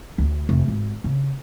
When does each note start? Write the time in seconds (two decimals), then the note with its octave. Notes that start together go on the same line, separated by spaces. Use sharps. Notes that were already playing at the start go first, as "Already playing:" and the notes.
0.18 D2
0.49 F1
0.68 G#1
1.04 C#3